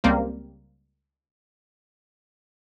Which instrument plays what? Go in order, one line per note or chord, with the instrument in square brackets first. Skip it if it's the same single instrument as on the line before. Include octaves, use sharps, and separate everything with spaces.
[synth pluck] C#2 G3 A#3 C4